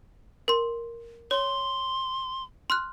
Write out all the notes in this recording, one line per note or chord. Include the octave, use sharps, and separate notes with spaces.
A#4 C6
C#5 C6
C6 F6 F#6